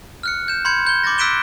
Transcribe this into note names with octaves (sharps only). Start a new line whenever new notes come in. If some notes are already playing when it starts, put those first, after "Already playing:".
F6 F#6 C#7
G6 E7
B5 C6 G6 G#6 C#7
G6 G#6 G7
C6 D6 G6 A6 A#6
E6 F#6 B6 D7 E7 G7